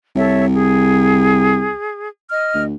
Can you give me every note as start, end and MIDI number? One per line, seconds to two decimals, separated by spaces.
0.16 1.69 36
0.16 0.45 69
0.16 0.45 73
0.16 0.45 76
0.51 2.09 68
2.30 2.64 75
2.30 2.64 89
2.54 2.76 38